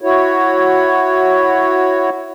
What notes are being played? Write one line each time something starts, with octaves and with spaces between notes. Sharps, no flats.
E4 F#4 C#5